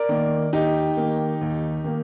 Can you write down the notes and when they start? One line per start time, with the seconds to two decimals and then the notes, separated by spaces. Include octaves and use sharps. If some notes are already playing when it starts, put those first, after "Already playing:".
Already playing: A#4 D5
0.09 D#3 A#3
0.53 D#2 D#4 G4
0.97 D#3 A#3
1.41 D#2
1.84 D#3 A#3